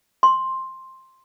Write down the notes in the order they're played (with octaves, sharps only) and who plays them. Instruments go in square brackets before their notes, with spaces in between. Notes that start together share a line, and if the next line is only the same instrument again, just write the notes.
[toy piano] C6